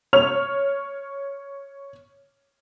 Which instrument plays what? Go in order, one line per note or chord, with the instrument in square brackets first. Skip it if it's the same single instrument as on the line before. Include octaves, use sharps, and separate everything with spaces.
[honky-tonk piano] C#5 F6 F7